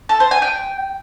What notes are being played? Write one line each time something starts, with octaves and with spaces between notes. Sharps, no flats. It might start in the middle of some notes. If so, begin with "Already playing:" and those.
A4
C5
G#5
G5